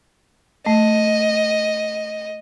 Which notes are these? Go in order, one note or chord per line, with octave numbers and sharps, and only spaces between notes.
A3 D#5